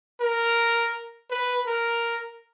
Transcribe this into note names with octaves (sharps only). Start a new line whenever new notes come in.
A#4
B4
A#4